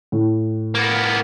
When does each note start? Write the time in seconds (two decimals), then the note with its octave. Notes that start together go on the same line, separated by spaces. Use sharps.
0.12 A2
0.75 A#3 B3